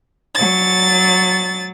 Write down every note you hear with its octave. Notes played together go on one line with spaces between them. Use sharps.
F#3 A6